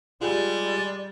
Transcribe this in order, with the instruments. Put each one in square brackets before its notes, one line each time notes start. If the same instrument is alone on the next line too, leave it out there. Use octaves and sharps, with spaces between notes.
[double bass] G3 [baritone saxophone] G#3 [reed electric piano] F4 G4 G#4 [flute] D5